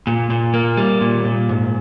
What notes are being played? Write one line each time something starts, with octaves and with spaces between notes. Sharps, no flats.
A#2
A#2
A#3
G3
A#2
A#2
G#2